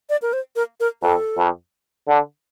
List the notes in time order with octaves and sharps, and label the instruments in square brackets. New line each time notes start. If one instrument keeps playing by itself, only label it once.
[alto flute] D5
A#4
C5
A#4
A#4
[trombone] F2 [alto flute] A4
[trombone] F2
D3